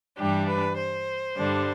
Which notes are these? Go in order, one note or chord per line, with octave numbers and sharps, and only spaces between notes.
G2 E3 G3 D4 G4
B4
C5
G2 D3 G3 D4